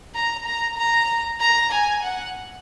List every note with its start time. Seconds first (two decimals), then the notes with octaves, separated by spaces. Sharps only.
0.15 A#5
0.45 A#5
0.78 A#5
1.40 A#5
1.71 G#5
2.03 F#5